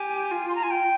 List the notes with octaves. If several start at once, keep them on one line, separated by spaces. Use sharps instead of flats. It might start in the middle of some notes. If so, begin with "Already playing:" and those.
Already playing: G4 G#5
F4
C6
A#5
G#5
G5